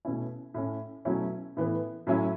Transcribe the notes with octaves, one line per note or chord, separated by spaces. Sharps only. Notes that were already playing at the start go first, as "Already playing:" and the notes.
B2 A3 C#4 E4
A2 A3 C#4
B2 F#3 A3 C#4 E4
A2 E3 B3
A2 F#3 C#4 E4